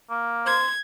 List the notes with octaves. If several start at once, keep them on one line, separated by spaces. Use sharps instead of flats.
A#3
C5 G#6